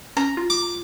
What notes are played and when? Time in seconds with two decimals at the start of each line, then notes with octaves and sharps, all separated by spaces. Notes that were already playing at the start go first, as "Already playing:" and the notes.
0.17 C#4 A#5
0.37 F4
0.50 D6